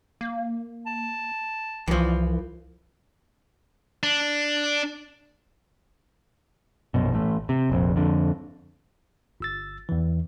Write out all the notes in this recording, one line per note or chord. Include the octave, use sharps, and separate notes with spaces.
A#3
A5
C2 E3 F3
D4
A#1 F#2 B2
A1 A3
C3
F1 A#1 F2
F2 D3
G1 E6 A6
E2 E3